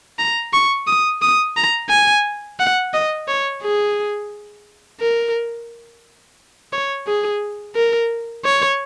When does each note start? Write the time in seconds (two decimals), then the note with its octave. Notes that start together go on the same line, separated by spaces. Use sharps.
0.19 A#5
0.54 C#6
0.87 D#6
1.22 D#6
1.57 A#5
1.90 G#5
2.60 F#5
2.94 D#5
3.28 C#5
3.63 G#4
5.01 A#4
6.73 C#5
7.07 G#4
7.76 A#4
8.45 C#5